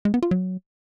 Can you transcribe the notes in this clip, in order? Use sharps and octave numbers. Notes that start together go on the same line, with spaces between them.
G#3
B3
F4
F#3